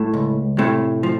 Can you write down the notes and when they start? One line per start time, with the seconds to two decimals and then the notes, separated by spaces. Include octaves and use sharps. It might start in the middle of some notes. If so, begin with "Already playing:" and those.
Already playing: A2 A3
0.14 C#2
0.58 A2 C3 A3
1.03 F3